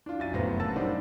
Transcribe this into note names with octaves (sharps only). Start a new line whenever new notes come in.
D4 F4
F#2 E5 A6 D#7
F1 A2 F#3 B3 C5 A#6
C#3 A#3 F#5 A5 E6 A6
G3 D4 D#4 C5